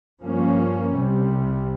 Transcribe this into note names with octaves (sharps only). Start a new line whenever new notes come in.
G2 F3 A#3 C#4
C2 C3 G3